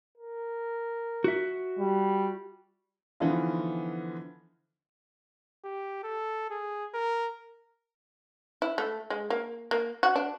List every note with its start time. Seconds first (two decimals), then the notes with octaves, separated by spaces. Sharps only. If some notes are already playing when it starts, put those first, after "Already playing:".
0.18 A#4
1.24 F#4 E5
1.79 G3
3.20 D3 E3 F3 B3 D#4 F4
5.65 G4
6.04 A4
6.50 G#4
6.94 A#4
8.62 E4
8.78 A3
9.10 G#3
9.30 A#3
9.71 A#3
10.03 F#4
10.16 D4